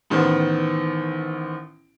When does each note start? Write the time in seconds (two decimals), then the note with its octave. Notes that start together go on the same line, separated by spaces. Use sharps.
0.10 A1 D#3 B3 C5